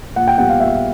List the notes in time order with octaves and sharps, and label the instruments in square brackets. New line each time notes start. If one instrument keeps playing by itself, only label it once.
[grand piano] A#2 F#5
G5
G3 B3 F#5
F5
A#2 E5